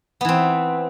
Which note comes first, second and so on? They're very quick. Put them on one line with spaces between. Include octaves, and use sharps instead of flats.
B3 E3 C4